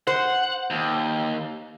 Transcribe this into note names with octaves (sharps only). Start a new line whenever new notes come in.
C5 F#5
D#2